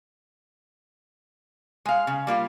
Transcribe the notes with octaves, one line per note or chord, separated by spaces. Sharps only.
G#3 F5
C#3
G3 A#3 F4